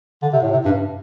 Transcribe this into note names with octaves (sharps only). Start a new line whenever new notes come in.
D3
C3
A2
C3
G2